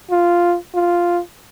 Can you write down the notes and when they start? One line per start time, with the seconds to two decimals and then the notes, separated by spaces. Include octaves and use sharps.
0.11 F4
0.75 F4